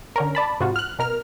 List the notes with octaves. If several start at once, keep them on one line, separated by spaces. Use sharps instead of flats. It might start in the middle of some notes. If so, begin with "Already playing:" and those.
D3 C#4 A#4
D5 A5 B5
G#2 C3 F4 F#4
F6 F#6
B2 A#4 F6